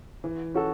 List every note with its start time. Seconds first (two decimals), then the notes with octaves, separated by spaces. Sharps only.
0.24 E3
0.54 C#4 F#4 A4